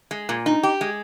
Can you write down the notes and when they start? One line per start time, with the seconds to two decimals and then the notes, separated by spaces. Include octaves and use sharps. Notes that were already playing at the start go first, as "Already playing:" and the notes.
0.11 G#3
0.29 A#2
0.46 D#4
0.63 G4
0.81 G#3